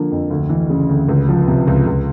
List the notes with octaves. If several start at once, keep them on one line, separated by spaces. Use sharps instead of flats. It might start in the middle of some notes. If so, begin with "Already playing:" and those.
Already playing: D3 F3 A#3
F2
D2
E3
C#3
D2
C#2
F3
C3
C#2
C#2